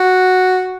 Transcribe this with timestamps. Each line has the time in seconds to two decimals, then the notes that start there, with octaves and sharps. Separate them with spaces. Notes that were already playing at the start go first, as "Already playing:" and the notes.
Already playing: F#4